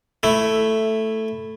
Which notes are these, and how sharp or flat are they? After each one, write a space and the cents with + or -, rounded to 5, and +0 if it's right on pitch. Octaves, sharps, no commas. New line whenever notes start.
A3 +0 E4 +0